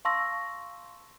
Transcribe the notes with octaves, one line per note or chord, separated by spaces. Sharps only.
F5 A5 C6 C#6 E6 A#6